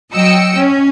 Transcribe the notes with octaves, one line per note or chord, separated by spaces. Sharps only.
F#3 D#5 G5 E6 C#7
C#4